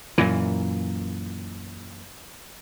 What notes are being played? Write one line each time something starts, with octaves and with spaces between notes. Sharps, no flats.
F#2 A#2 E3